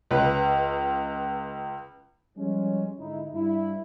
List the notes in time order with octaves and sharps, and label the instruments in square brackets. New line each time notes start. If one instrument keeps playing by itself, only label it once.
[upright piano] C#2 B4
[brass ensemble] F3 G3 G#3 C#4
G#2 D3 D#4 E4
G2 E4